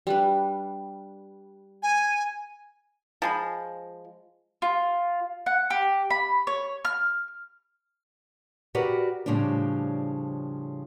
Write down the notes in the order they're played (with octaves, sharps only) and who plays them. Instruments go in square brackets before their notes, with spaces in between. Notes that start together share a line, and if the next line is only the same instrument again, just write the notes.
[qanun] G3 D4 B4
[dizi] G#5
[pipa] F3 G#3 B5
[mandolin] F4
F#5
G4
B5
C#5
F6
[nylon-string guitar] F#4 G4 A#4 B4 D5 F#5
A2 C#3 F3 G3 D4